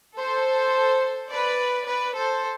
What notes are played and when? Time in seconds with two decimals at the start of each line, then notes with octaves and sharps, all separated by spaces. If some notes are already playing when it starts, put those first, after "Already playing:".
0.17 A4 C5
1.30 B4 D5
1.87 B4 D5
2.15 A4 C5